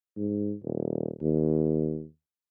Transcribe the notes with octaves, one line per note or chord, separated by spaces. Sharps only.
G#2
D#1
D#2